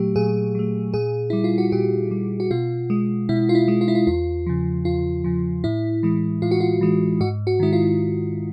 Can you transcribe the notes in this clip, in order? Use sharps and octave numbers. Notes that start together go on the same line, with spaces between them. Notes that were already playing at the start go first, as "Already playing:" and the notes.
Already playing: A#2 F#3 A3 G4
A#2 G#4
F#3 A3
A#2 G#4
G3 E4
F4
F#4
A#2 G4
G3
F#4
B2 F4
G#3
B2 E4
F4
E4
G#3
F4
E4
F4
E2 F4
C#3 F3
E2 F4
C#3 F3
A2 E4
E3 G#3
A2 F4
F#4
F4
E3 G#3
G#2 F#4
F#4
D#3 G#3 E4
F4